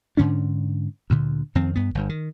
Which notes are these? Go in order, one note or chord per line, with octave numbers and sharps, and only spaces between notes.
G#2 D3 C#4 D4
D2 A#2 D3
F2 D#3 C4
G2 B3
G1 G2
D#3